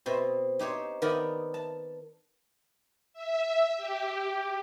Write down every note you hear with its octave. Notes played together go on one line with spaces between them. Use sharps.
B2 C4
D#4 G4 C5 C#5
D#3 B3 D5 D#5 A#5
A5
E5
G4